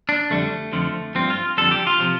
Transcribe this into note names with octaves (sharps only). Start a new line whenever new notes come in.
D4
F2 D3 G3 A3
F2 D3 F3
G2 F3 C4
F4
F2 D3 G3 A4
G4
F4
C3 F3